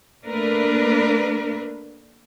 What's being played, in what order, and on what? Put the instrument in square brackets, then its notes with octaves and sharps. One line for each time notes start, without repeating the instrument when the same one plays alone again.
[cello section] A3 A#3 D4 A#4 B4